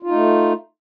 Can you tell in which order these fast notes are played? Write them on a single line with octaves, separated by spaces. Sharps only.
F4 D#4 A3